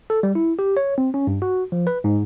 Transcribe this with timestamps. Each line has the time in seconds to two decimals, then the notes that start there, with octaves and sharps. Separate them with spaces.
0.10 A4
0.23 G3
0.35 E4
0.59 G4
0.77 C#5
0.98 C4
1.14 C#4
1.27 G2
1.42 F#4
1.72 F3
1.87 B4
2.04 G#2